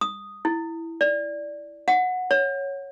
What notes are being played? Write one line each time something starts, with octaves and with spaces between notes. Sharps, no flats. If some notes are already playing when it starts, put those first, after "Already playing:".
D#6
E4
D5
F#5
C#5